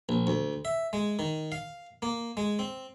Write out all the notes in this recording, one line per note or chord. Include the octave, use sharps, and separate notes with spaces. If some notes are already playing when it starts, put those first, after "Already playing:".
A#1
D2
E5
G#3
D#3
F5
A#3
G#3
C4